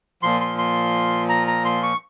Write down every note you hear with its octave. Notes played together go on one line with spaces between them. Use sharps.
A#2 F3 C6
C6
C6
A#5
A#5
C6
C#6